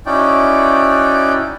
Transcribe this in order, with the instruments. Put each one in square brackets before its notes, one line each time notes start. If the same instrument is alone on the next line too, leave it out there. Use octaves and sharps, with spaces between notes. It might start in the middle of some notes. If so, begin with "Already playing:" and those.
[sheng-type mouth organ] C#4 D#4 E4 F#4 D5 G5